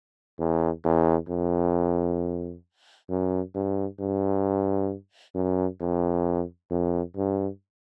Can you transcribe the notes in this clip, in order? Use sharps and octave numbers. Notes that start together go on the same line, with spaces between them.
E2
E2
F2
F#2
G2
G2
F#2
F2
F2
G2